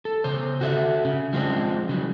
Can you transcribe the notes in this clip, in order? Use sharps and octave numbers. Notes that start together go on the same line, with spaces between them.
A4
C#3 C5
F#4 A4 D#5 E5
C#3
F3 G#3 A3 C4 D4
C#3 F#3